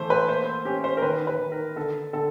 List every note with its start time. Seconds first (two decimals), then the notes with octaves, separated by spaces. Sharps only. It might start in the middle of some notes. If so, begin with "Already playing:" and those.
Already playing: E3 F3 A3 C5
0.10 B4
0.29 A#3 C5
0.65 C#4 G4
0.84 C5
0.97 A#4
1.02 D#3 B4
1.27 B4
1.39 D#3
1.52 A#4
1.76 D3 A4
2.13 D3 A4